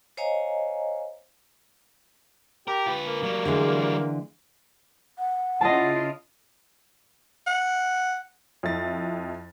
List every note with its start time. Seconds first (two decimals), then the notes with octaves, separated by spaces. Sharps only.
0.17 C5 C#5 D#5 F5 G#5 A#5
2.68 G4 A#4
2.86 F4 B4
3.04 A#3
3.23 F#3 G3
3.45 D3 E3 G#3
5.18 F#5
5.61 C#3 E4 F4 D#5 A5
7.47 F#5
8.63 F2 E4 A6